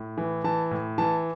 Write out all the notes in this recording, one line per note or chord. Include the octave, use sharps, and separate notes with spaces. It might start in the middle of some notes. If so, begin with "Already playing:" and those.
Already playing: A2
E3
E3 A5
A2
E3 A5